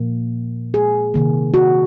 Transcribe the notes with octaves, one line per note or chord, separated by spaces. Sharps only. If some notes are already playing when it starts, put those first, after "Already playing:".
Already playing: A#2 F3 A#3
G#4
C3 D#3 A#3
F#4